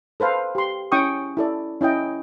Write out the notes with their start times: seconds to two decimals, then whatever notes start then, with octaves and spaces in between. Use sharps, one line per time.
0.20 A4 B4 C5 F5
0.55 G4 C6
0.92 C#4 E4 G5 C#6 D#6
1.37 E4 A4 D5
1.81 C#4 E4 D#5 G5